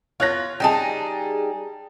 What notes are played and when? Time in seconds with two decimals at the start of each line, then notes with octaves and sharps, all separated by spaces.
0.20 F4 C#5 F#6 A#6
0.60 G3 D#4 G#4 G5 A5